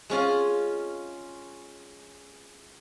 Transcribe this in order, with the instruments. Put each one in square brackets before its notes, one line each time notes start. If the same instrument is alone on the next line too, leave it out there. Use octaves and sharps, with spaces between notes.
[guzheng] G#3 C#4 F4